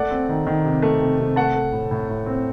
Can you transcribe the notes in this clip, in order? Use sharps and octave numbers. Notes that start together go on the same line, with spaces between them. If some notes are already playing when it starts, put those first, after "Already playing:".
Already playing: A3 D5 F#5
C4
D#3
D#3
C3
A3
C3
C3
A3 F#5 A5
A3
A2
A2
A2
C4